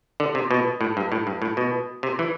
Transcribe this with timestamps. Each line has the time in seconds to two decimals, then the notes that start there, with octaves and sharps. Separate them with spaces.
0.20 D3
0.35 C3
0.51 B2
0.81 A2
0.97 G2
1.12 A2
1.27 G2
1.42 A2
1.57 B2
2.03 C3
2.19 E3